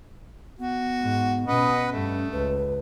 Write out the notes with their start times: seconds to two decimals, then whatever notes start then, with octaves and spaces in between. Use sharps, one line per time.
0.59 B3 F#4
1.01 G#2
1.47 B2 C#4 B4 D#5 F#5
1.92 G2 A3
2.33 C#2 B4